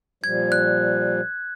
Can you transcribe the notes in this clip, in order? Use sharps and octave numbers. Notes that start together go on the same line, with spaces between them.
A#2 F3 G3 G#6
F#6